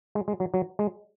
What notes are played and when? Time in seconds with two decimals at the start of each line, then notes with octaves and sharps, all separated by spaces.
0.15 G#3
0.28 G#3
0.40 F#3
0.54 F#3
0.79 G#3